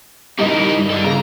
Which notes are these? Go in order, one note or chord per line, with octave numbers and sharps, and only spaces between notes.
G3 D#4 E4 A#4 D#5
G2
A4 D5
C#3 A#5